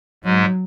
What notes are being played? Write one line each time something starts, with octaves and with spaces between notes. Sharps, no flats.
G#2 F#3 G#3